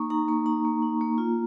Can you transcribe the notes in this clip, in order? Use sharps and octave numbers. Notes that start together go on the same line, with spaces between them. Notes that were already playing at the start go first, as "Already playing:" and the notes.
Already playing: A#3 D#4 A#5 C#6
D#4 A#5
A#3 A#5
D#4 A#5
A#3
D#4
A#3
F4